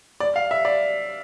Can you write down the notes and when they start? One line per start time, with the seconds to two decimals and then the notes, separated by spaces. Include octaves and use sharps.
0.20 D5
0.36 F5
0.51 E5
0.65 D5